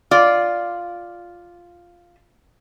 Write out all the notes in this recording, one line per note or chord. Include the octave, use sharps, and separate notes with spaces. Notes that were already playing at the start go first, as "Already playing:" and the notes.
F4 D5